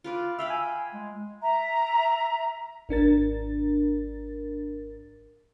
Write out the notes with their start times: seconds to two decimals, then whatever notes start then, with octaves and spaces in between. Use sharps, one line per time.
0.04 F4 B4 D5
0.39 E5 F5 G5 B5
0.50 G#5
0.94 G#3
1.41 E5 A#5
2.89 G#1 D4 A#4 A6